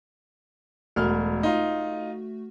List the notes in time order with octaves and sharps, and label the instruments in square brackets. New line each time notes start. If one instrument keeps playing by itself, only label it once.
[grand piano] E1 F6 [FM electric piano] A3 F#4
[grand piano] D#4 F4